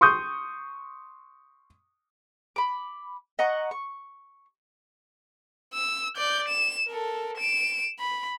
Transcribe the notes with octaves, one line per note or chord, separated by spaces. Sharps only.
C6 C#6 D#6 G6
B5 D6
D#5 F#5 A#5 C#6
C#6
E6
D5 G6
E7
A4 A#4
D7 E7
B5